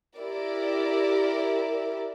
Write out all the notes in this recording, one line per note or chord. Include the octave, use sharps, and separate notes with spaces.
E4 G4 A#4 D5